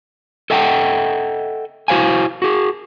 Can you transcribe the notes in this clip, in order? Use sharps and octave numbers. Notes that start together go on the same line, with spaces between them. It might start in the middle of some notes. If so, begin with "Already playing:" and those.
A4 D#5 E5 F#5 G5
E4 F#4 C5 F5 G#5
F#4 G#4